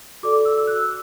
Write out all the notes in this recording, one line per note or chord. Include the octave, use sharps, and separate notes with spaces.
F#4 A4 D5 D6
E6
E6
F#6